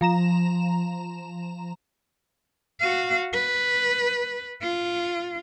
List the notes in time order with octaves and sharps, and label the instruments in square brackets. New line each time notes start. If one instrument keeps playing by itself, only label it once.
[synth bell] F3 A#5 E7
[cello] F#4 F5
B4
F4